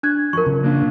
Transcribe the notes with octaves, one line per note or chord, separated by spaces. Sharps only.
D4 F#6 G#6
F#2 F3 A#4 C#6
C#3
A#3 D4 F4